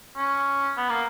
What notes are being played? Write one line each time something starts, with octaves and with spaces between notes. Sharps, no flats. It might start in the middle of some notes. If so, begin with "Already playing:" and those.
C#4
B3
A#3